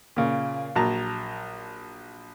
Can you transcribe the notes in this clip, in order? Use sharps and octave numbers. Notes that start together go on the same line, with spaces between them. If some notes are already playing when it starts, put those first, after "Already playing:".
A#2 C#3
A#1 F#3 A5 A#5